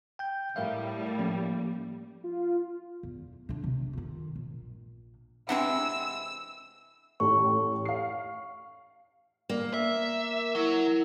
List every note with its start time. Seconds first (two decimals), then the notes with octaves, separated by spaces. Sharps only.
0.19 G5 G6
0.56 A2 G3 A#4 E5 F5
1.19 F3 A#3 C#4
2.24 F4
3.03 E2
3.49 D3 D4
3.64 C3
3.93 D#3 F4
4.36 A#1
5.49 C3 E3 G#3 C4 D4 F#5 E6
7.20 A1 G4 A4 C#6
7.85 F5 C7
9.49 A#3 D5
9.74 E5 E6
10.55 F#3 E4 A#4